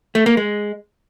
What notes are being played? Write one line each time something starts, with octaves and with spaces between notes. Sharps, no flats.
A3
A#3
G#3